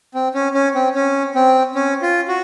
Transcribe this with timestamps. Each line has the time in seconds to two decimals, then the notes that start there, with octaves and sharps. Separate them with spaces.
0.14 C4
0.34 C#4
0.54 C#4
0.75 C4
0.95 C#4
1.35 C4
1.75 C#4
2.02 F4
2.28 F#4